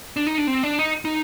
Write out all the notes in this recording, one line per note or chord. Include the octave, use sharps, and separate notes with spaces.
D4
D#4
D4
C4
D4
D#4
D#4